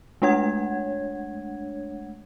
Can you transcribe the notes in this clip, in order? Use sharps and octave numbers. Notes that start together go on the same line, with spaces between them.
G#3 A3 D4 C#5 F#5 G#6